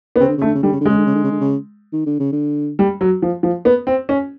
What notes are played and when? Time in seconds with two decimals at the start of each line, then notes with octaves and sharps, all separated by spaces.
0.16 B3
0.20 C#3 C4
0.28 D3
0.37 C#3
0.42 A3
0.46 D3
0.55 C#3
0.63 D3 G3
0.72 C#3
0.80 D3
0.85 C#3 G#3
0.98 D3
1.06 C#3
1.15 D3
1.24 C#3
1.31 D3
1.41 C#3
1.93 D#3
2.06 D3
2.19 C#3
2.32 D3
2.79 G3
3.01 F#3
3.22 F3
3.43 F3
3.65 B3
3.87 C4
4.09 C#4